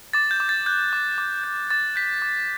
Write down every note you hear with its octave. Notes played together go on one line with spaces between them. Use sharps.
D6 A6
G6
D6
A6
F#6 G6
D6
D6
G6
D6 A6
G6 B6
D6